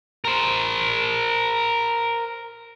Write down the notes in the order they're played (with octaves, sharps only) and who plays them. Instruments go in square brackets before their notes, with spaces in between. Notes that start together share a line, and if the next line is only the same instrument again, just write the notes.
[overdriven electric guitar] A#4 C5